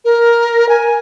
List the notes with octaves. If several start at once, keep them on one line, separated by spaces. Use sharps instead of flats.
A#4
G#5